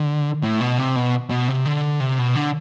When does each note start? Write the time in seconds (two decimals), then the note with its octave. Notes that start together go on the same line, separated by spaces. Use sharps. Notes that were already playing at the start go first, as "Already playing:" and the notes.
Already playing: D3
0.43 A2
0.61 B2
0.78 C3
0.96 B2
1.30 B2
1.48 C3
1.66 D3
2.00 C3
2.19 B2
2.35 D3